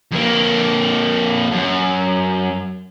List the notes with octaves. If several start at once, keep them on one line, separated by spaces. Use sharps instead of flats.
F2 A#3
F#2